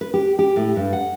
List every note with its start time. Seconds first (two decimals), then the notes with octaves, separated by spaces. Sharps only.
0.01 B4
0.14 G4
0.39 G4
0.56 A2
0.76 G2
0.93 F#5